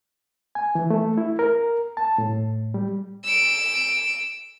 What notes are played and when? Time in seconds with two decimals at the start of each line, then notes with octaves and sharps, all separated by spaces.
0.55 G#5
0.75 E3
0.90 A3
1.18 E4
1.39 A#4
1.97 A5
2.18 A2
2.74 G3
3.24 E6 D7